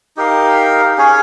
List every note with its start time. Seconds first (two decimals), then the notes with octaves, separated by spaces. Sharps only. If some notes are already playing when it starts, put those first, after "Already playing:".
0.17 D#4 G4 A#4 F5
0.98 C#4 G#4 C#5